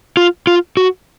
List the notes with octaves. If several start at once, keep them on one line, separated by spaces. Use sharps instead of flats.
F4
F4
F#4